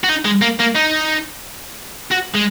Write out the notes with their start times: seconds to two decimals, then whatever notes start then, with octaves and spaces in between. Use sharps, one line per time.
0.04 F#4
0.09 D#4
0.25 G#3
0.42 A#3
0.60 A#3
0.76 D#4
2.11 F#4
2.34 G#3